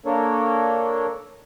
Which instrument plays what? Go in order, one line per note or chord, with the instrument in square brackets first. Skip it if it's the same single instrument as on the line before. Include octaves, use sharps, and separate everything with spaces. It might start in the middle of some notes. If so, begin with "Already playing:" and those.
[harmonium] A#3 D4 A4 A#4 C#5